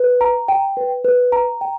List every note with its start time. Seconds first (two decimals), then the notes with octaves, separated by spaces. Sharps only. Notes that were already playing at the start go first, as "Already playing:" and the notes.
Already playing: B4
0.21 A#5
0.48 G5
0.77 B4
1.04 B4
1.32 A#5
1.61 G5